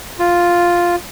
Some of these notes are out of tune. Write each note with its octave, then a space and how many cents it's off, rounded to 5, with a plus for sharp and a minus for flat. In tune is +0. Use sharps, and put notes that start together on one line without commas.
F4 +0